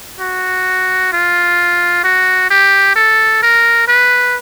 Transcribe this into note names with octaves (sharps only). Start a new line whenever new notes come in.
F#4
F4
F#4
G4
A4
A#4
B4